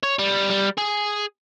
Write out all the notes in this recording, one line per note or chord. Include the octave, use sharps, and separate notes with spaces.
C#5
G3
G3
G#4